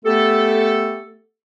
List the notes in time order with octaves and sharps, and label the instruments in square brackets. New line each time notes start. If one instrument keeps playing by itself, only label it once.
[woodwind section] A3 B3 G4 A4